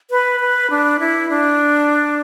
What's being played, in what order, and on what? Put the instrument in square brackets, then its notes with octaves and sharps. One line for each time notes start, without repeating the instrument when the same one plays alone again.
[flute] B4
B4
D4
E4
D4